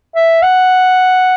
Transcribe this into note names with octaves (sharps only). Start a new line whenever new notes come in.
E5
F#5